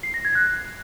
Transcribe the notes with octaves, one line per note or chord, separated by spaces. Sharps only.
C7
A#6
G#6
F#6